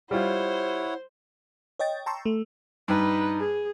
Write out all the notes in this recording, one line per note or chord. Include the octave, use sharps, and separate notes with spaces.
G3 E4 F4 C5 C#5 F#5
C#5 D#5 G5 A6
G5 A5 A#5 C6 C#6 E6
A3
G2 D#4 B4
G#4